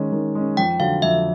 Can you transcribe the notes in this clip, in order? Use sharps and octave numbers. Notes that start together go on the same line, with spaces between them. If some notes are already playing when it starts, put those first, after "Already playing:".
Already playing: D#3 G#3 C#4
D#3
G#3 C#4
F2 G5
D3 F#3 F5
F2 E5